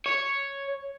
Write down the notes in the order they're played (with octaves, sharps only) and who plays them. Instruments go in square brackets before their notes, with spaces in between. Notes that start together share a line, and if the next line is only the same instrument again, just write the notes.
[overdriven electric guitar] C#5